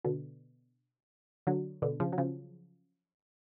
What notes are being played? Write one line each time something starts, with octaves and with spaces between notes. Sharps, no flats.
B2 D3
D3 F#3
B2 D3
C#3 F3
F#3
C#3 F3